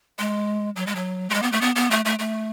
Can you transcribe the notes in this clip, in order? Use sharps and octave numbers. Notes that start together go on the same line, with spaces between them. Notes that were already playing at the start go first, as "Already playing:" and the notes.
G#3
F#3
G#3
F#3
A3
G#3
B3
A3
B3
B3
A3
A3
A3